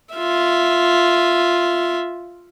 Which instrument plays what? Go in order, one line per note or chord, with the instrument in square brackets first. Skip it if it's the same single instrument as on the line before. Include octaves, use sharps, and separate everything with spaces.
[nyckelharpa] F4 E5